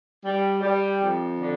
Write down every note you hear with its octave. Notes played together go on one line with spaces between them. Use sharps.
G3
G3
F2
D3